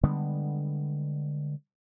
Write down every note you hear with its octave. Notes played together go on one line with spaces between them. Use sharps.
D3 G3 G#3 B3